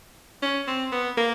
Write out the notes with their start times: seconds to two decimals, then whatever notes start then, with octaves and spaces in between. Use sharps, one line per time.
0.42 C#4
0.68 C4
0.92 B3
1.17 A#3